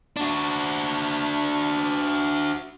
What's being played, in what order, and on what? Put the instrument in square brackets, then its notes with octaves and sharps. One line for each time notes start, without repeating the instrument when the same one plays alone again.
[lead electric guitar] D4 F#4